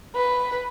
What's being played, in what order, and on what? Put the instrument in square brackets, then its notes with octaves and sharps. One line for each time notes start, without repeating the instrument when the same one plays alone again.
[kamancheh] B4